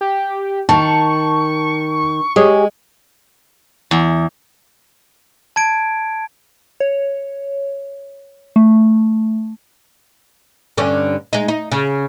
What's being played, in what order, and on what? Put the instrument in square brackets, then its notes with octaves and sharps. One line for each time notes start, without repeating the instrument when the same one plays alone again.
[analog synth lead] G4
[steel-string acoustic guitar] D#3 [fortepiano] A5 [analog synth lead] C#6
[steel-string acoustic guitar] G#3 [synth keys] G4 G#4 C#5
[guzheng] E2
[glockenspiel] A5 G#6 D7
[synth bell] C#5
A3
[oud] G2 D3 C#4
G#3 D#4
D#4
C#3